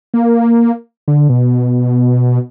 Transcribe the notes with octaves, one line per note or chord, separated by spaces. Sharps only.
A#3
D3
B2